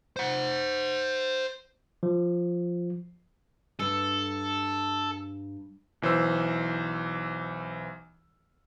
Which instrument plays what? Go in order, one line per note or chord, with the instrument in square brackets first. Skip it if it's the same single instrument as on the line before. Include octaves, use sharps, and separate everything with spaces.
[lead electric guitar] C5 F#5
[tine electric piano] F3
[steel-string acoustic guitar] G2 [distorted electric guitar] A4
[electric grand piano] B1 E3 C5 E6